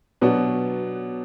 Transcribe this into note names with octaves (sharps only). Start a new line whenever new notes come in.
B2 F#3 B3 D4 F#4